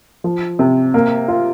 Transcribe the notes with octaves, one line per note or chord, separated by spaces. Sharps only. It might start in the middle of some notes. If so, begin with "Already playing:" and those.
F3
C3
A#3
F4